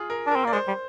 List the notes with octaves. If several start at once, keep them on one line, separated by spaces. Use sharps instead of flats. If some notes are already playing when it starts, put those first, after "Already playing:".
Already playing: F4 G#4
A#4
D4
C4 A#4
A#3 D5
G#3 C5
G3